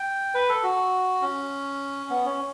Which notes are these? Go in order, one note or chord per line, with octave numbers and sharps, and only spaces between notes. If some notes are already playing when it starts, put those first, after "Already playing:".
Already playing: G5
B4
A4
F#4
C#4
B3
C#4